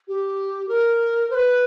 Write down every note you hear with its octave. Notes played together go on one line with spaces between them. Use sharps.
G4
A#4
C5
B4